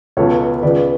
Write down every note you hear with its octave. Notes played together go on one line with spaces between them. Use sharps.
C#2 B2 A4 C#5
C#2 C#3 B4 D5